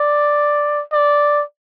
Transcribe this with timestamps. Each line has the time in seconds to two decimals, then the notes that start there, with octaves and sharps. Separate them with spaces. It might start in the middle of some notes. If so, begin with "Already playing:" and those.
Already playing: D5
0.93 D5